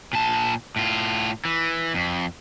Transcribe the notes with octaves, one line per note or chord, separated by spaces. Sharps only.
A#2 A5
A2 F4
E3
F2